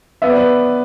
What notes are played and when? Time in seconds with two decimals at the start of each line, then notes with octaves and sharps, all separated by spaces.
0.22 B3 E5
0.30 D5
0.37 B4